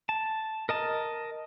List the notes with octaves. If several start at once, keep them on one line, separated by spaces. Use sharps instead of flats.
A5
A#4 D#5 A5